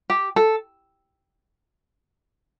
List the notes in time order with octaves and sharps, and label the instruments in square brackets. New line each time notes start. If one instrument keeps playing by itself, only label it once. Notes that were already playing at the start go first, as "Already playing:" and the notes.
[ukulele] G4
A4